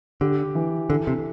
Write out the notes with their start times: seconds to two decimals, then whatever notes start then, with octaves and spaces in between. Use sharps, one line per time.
0.21 D3 G4
0.55 E3
0.90 D3 A4
1.07 C3